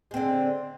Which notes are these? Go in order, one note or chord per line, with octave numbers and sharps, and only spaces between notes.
D3 G#3 C4